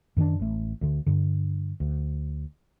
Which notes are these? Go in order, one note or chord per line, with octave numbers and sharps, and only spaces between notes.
F#2 D#3 C#4 D4
A1 A3
D2 D3
G2 D3
D2